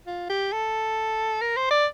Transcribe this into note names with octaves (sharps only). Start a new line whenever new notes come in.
F4
G4
A4
A#4
C5
D5